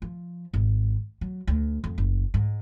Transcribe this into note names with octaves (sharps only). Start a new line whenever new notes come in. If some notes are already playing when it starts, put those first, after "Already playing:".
F3
G#1
F#3
D2
F2
F#1
G#2